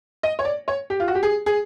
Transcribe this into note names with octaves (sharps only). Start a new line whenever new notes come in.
D#5
C#5
D5
C#5
G4
F4
F#4
G4
G#4
G#4